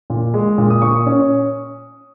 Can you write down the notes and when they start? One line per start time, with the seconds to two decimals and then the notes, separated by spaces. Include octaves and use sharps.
0.10 A#2
0.34 G#3
0.58 A#2
0.70 D#6
0.82 A#2 C#6
1.06 C#4